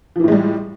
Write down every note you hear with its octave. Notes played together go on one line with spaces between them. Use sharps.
A2 E3 F3 G3 G#3